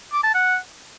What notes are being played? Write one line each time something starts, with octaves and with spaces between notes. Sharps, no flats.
D6
A5
F#5